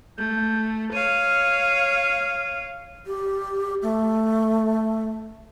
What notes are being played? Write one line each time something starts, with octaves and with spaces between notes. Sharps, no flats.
A3 G6
C#5 F5 D#7
G4
A3